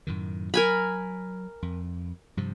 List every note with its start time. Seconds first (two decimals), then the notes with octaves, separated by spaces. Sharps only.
0.07 F#2 A2 D#3
0.54 F#3 A#4 G#5 B5
1.62 F2
2.37 G2 C3 F3